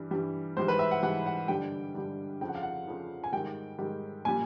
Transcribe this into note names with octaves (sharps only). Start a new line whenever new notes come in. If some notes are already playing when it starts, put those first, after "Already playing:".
Already playing: G2 E3 G3
G2 E3 G3
G#2 E3 G3 C5
B4
E5
F#5
G#2 E3 G3 F#5
F#5
G2 D3 G3 G5
G2 D3 G3
F2 C#3 F3 G5
F#5
F5
F#5
F2 C#3 F3
G#5
G#2 D#3 G3 G5
G#2 D#3 G3
A#2 G3 G#5